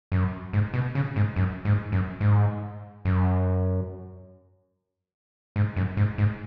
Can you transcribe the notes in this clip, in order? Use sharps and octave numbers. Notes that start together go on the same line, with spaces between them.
F#2
G#2
B2
C#3
G#2
F#2
G#2
F#2
G#2
F#2
G#2
F#2
G#2
G#2